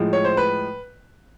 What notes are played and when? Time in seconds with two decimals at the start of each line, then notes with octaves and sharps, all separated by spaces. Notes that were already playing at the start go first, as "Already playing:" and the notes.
Already playing: A2 F3 G#3
0.13 C#5
0.25 C5
0.37 B4